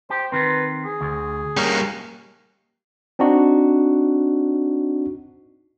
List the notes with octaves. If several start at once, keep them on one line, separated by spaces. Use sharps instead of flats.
G4 C5
D#3 C4 B4
G#4
D2
G3 A#3 C#4
C4 D4 D#4 F#4